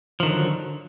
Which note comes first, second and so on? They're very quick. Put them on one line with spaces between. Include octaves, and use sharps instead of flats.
F3 D#3 D3 F#3